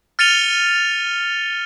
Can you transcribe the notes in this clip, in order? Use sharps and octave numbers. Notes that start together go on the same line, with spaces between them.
F6 A6 C#7 D#7 F7 G7